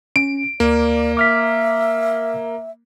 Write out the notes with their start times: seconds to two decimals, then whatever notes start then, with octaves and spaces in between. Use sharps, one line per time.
0.16 C#4 D7
0.60 D2 A#3 D5
1.17 E5 D6 F6 B6